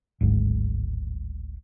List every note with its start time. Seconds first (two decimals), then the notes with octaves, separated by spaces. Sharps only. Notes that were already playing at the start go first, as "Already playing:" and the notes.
0.21 D1 G#1 G#2